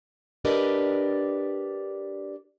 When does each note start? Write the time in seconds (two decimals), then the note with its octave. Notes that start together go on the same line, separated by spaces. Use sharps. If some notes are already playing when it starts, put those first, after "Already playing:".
0.45 D4 G4 A#4 B4 D5 D#5